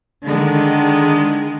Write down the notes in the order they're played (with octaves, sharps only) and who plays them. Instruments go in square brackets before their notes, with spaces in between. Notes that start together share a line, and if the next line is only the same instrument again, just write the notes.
[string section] D3 D#3 G#3